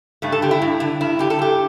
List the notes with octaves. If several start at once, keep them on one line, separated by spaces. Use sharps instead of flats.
G2 A3
A4
D3 G4
E4
G2
D3
G2 E4
D3 G4
A4
G2 G4